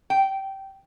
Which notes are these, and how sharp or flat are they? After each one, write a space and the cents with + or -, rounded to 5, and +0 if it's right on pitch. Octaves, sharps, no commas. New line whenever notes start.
G5 -15